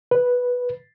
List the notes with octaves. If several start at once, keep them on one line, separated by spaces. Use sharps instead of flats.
B4